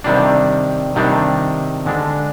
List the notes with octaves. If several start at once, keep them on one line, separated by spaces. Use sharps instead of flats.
C3 D#3 G3 D4
C3 D#3 G3 D4
D3 G#3 D4